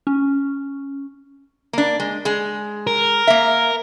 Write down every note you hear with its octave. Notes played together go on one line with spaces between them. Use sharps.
C#4
A#3 D4
G#3
G#3 G#4
A#4
A#3 E5